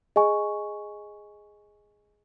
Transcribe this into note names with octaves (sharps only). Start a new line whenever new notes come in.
G#4 D#5 G#5 C#6